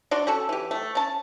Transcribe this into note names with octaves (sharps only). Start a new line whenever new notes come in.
D4 F#4 D5 C6
C#4 F#4 A4
E3 G4
A3
C#4 A5